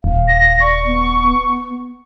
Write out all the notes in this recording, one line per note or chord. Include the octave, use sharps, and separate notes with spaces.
D#1 F5
A#6
D5 C#6
B3